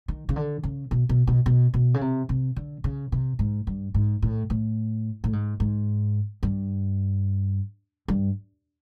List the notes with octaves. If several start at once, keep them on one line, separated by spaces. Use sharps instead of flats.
D#3
C#3
D3
C#3
B2
B2
B2
B2
B2
C#3
C3
C3
D3
C#3
C3
G#2
G2
G#2
A2
A2
A2
G#2
G#2
G2
G2